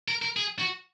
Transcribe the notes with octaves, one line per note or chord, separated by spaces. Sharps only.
A#4
A#4
G#4
F#4